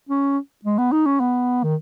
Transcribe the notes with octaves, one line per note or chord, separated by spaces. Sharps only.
C#4
G#3
B3
D#4
C#4
B3
D#3